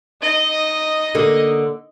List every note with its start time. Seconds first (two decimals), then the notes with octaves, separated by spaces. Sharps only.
0.22 D#4 D#5
1.15 D3 A#3